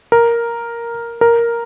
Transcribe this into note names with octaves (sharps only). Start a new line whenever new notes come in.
A#4
A#4